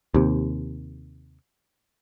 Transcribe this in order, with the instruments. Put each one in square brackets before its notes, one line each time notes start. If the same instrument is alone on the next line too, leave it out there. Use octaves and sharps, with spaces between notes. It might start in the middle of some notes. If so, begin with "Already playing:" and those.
[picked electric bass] D#2 C3